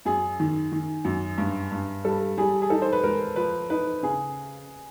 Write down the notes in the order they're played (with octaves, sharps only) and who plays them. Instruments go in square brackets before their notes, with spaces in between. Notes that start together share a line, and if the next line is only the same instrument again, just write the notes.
[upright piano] F#2 [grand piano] G#4
[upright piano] D#3
D#3
F#2
G2
G2
[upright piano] G3 [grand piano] A4
[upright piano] G3 [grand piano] G#4
[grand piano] G#4
[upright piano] D#4 [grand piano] A4
[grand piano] C5
B4
[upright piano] G#3 [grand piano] A#4
[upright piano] F3 [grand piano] B4
[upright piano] D#4 [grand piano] B4
[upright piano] C#3 [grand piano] G#4